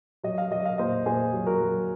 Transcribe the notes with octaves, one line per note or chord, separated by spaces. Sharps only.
F#3 D#5
F5
F#3 D#5
F5
A#2 C5 D#5
A#2 G#4 C5
F#3
F#4 A#4
F#3